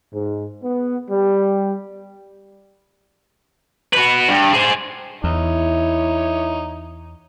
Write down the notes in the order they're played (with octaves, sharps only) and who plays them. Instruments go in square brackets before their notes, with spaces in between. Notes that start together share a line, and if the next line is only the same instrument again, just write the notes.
[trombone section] G#2
B3
G3
[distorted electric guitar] F#4 B4
G2
G#4 C5
[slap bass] E2 [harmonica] D#4 C#5 [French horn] E4